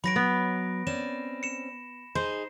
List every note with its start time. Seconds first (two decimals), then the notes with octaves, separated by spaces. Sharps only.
0.04 F#3 B4 C#5 B5 A#6 D7
0.16 B3
0.87 C4 C#4 D5 E7
1.43 C#7 E7
2.15 D#4 G#4 C5